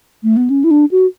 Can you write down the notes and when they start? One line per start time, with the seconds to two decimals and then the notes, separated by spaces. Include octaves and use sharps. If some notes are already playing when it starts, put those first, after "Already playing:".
0.23 A3
0.37 B3
0.50 C#4
0.64 E4
0.71 D4
0.91 F#4